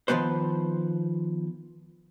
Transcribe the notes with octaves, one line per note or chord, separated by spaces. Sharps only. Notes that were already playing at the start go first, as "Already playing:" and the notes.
D#3 F3 B3 B4 C5